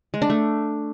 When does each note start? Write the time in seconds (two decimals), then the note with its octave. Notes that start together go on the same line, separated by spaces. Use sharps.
0.14 G#3
0.22 D4
0.30 A3